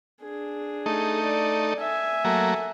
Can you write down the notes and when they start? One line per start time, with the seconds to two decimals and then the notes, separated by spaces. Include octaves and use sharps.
0.22 D4 G#4
0.86 A3 D#4
1.23 D5
1.80 E5 G#5
2.25 F#3 A3 A#3